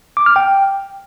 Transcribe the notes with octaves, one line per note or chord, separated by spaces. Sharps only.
D6
F6
G5